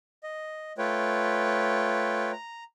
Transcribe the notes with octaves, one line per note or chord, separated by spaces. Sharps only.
D#5
A3 F4 B4 C#5 G5
A#5